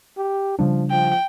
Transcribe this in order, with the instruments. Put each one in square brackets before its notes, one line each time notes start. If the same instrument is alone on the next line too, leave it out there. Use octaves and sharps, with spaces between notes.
[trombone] G4
[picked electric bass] C#3 G3 D4 [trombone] F3
[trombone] F3 [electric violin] G5